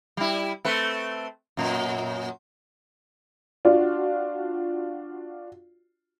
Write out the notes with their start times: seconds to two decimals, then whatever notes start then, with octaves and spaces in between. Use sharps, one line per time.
0.17 G3 E4
0.65 A3 C4 B4
1.57 F#2 A#2
3.65 D4 F4 F#4